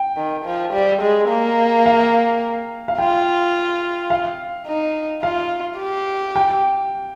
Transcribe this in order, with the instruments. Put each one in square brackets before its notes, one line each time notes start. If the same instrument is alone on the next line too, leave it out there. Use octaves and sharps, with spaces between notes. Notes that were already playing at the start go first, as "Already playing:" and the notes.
Already playing: [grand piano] G5
[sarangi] D#3
F3
G3
G#3
A#3
[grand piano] F5
F5
[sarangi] F4 [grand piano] G5
[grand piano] F5
[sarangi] D#4
[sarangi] F4 [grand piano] F5
[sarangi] G4
[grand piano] G5